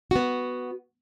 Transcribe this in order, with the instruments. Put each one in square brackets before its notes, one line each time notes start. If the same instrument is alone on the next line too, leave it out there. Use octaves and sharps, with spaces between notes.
[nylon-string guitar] B3 F#4